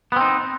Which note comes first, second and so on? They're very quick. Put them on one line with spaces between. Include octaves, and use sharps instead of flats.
B3 C4 D#4